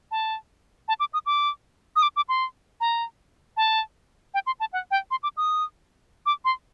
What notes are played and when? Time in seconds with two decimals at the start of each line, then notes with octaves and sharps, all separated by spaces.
0.11 A5
0.88 A5
1.00 D6
1.13 D#6
1.26 D6
1.96 D#6
2.02 D6
2.16 D6
2.29 C6
2.81 A#5
3.57 A5
4.34 G5
4.46 C6
4.60 A5
4.73 F#5
4.91 G5
5.11 C6
5.23 D6
5.37 D#6
6.26 D6
6.45 C6